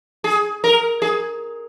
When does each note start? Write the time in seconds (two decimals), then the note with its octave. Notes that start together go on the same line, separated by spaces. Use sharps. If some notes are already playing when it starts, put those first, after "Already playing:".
0.24 G#4
0.64 A#4
1.02 G#4